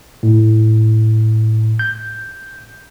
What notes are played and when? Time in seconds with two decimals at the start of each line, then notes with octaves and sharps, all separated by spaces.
0.23 A2
1.79 G6